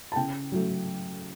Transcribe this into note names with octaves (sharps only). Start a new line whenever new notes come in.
A5
C#3 G5
F#3 A3